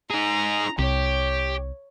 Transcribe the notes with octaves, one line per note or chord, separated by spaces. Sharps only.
D#4 G#4 A#5
C2 G4 C#5